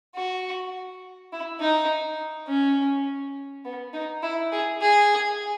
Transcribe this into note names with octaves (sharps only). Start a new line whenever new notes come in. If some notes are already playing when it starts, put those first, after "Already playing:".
F#4
E4
D#4
C#4
B3
D#4
E4
G#4
G#4